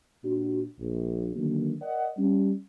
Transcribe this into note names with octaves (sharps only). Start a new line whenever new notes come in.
A#2 D4 F#4
A#1
D3 D#3 F#3 A#3 F#4
A#4 D5 D#5 F#5
G3 C#4